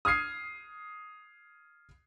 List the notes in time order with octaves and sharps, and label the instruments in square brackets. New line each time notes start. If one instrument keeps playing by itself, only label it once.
[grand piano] D#6 F6 G#6 C7 D#7